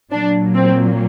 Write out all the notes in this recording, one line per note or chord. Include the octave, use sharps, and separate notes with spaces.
A#2 F#3 A#3 D4
C4